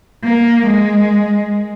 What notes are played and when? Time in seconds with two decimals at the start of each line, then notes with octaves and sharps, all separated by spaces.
0.24 A#3
0.66 G#3